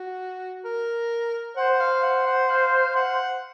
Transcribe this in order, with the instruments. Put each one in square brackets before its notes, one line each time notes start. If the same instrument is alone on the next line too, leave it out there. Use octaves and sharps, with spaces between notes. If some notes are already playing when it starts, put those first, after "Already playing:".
Already playing: [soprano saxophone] F#4
A#4
[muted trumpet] C5 [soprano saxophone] F#5
[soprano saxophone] F5
F#5
F#5
F5
F#5